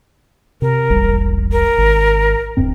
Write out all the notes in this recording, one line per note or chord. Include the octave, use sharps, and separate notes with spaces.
C3 A#4
E1 A#1 G3
A#4
G#1
D1 G2 C4